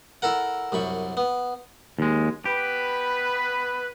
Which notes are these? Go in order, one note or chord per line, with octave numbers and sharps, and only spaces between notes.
E4 A4 A#4 F#5
C2 F#2 B5 C#6
B3
D#2 G#3
B3 G4 B4